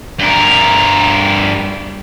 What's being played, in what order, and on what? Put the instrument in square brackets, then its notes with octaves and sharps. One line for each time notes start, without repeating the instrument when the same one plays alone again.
[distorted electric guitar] G2 A#4